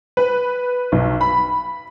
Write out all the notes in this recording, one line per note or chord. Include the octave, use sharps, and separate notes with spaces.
B4
B1
B5